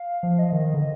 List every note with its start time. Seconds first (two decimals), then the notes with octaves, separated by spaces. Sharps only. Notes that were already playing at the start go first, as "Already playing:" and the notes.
Already playing: F5
0.23 F3
0.39 D#5
0.53 D#3
0.74 D3